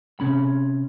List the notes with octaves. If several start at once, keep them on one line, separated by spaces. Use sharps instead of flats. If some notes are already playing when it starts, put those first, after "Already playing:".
C3 C#4 B5